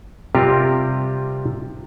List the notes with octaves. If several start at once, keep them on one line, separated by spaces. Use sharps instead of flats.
C3 G3 C4 F4 G4 A#4